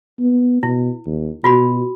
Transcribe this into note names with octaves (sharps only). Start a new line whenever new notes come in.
B3
B2 E4
D#2
B2 F4 F#4 B5